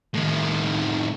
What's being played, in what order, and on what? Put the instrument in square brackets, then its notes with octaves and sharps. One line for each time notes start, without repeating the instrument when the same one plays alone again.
[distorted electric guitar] A2 D#3